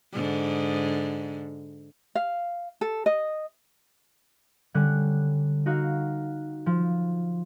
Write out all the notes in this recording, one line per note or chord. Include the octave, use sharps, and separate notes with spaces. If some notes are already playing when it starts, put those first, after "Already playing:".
G#2 D3
F5
A4
D#5
D3 G3 C#4 F#6
D#4 F#4 F5
F3